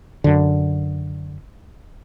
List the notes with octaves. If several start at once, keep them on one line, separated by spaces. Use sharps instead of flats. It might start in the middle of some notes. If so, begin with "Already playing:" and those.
F#2 D3